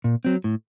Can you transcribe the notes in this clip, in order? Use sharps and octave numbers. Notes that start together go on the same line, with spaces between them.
A#2
F#3 C4
A2